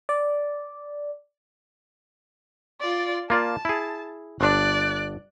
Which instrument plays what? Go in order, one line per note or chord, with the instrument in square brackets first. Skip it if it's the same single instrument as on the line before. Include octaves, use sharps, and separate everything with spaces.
[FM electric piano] D5
[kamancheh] F4 D5
[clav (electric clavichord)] A#3 F4 D5 [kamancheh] A5
[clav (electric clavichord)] E4 G#4
[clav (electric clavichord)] G1 D4 [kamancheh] D5 F#6